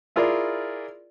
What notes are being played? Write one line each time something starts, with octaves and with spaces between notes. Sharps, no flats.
E4 F4 G#4 A#4 D5